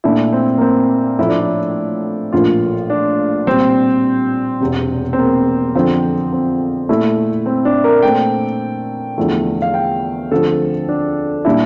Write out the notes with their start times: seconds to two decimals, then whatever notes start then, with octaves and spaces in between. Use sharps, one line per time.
0.04 A#2 A3 D4 E4
0.32 C4
0.58 A#3
0.62 C4
1.18 A2 F3 A3 E4
1.29 D4
1.40 E4
2.32 A#1 A2 F3 A#3 F4
2.90 D4
3.46 C2 A#2 G3 C4
4.60 E1 E2 C3
5.13 C4
5.18 A#3
5.75 F2 D3 F3 C4
6.32 C4
6.89 A#2 A3 E4
7.46 C4
7.65 D4
7.84 A#4
8.02 A#2 A3 C4 G5
9.18 E2 D3 F3 A3 E4
9.62 F5
9.74 G5
10.31 D2 D3 F3 C4 A4
10.89 D4
11.45 A#2 G3 D4 E4